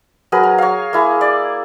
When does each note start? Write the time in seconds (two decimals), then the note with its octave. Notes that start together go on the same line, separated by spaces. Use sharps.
0.32 F#3 G#4 A#4 B4
0.43 A#4
0.58 C#5 F5
0.93 A#3 E4 G#4
1.21 D5